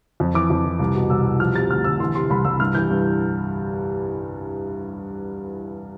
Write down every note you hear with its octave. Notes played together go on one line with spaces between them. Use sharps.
F2
E3 D6
F2
E3
C2
B2
C2 E6
B2
F3 F6
C3 A6
D2 F6
D2 E6
E3 C6
C3 C6
C2 B5
C2 E6
G2 F6
E3 G6
G2